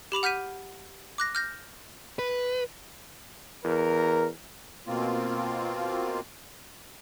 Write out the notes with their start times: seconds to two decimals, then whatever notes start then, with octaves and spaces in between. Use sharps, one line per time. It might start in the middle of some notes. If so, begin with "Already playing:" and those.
0.12 G4 B5 D6 F7
0.23 F#5 F6 G6 B6 D#7
1.18 D6 F#6 A#6
1.35 F6 G6 A#6
2.19 B4
3.65 E2 A#4
4.87 B2 A#3 C4 F4